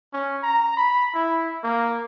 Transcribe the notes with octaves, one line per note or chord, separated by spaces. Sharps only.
C#4
A#5
B5
E4
A#3